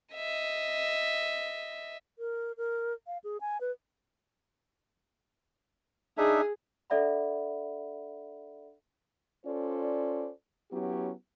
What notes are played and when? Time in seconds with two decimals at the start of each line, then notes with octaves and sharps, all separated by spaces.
0.14 D#5 E5
2.19 A#4
2.57 A#4
3.07 F5
3.24 G#4
3.41 G#5
3.61 B4
6.18 D4 D#4 G#4 E5
6.90 D4 A4 D5 E5 F#5 B5
9.46 C#4 F4 A4 C5 D5
10.71 F#3 B3 C#4 E4 F#4 G4